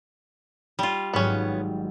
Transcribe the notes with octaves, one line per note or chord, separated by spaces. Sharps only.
G3 F4
G#1 G#2 F#3 B3 C#4